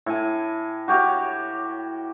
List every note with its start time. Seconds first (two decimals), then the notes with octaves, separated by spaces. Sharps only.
0.06 A2 G#5
0.88 F#4 G4 C#5 F5